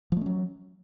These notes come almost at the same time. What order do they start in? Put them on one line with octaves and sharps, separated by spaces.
F3 A3 C#4 F#3